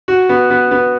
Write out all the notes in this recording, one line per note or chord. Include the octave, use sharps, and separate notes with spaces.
F#4
B3
B3
B3